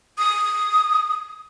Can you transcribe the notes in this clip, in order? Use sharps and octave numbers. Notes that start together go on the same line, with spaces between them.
D#6